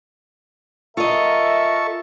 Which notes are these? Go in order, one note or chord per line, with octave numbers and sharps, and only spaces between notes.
F4 A4 A#4 D#5 E5 C#6